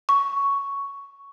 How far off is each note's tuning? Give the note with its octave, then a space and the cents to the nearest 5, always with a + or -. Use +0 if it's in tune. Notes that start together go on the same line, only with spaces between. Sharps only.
C#6 +5